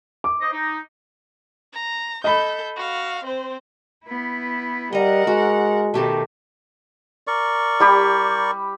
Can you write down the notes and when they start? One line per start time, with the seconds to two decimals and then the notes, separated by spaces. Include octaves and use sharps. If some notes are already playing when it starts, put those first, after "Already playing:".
0.24 D6
0.41 C5 D#5
0.53 D#4
1.73 A#5
2.24 A4 D#5 B5 G6
2.77 F#4 F5
3.24 C4 C5
4.06 B3 E4
4.93 G3 A#4 D#5 F#5 A#5
5.27 G#3 F#4
5.94 B2 D#3 A3 G4 A4
7.27 A#4 D5 C#6
7.80 G3 G4 B5